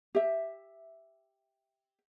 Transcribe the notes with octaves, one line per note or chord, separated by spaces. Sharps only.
G4 E5